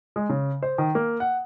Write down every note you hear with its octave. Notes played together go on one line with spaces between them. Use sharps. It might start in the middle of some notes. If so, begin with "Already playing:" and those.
G#3
C#3
C5
D#3
A#3
F#5